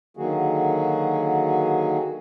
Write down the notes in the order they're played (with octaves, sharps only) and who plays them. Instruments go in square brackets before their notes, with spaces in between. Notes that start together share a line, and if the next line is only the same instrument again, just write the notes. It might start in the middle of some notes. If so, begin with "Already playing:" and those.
[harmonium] D3 D#3 F#3 A#3 F#4 G#4